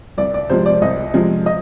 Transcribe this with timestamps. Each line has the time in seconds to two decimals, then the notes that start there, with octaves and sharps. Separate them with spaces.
0.18 C2 D5
0.34 D5
0.50 C3 F3 G#3 C5
0.66 D5
0.82 C2 D#5
1.14 C3 F3 G#3
1.46 D#5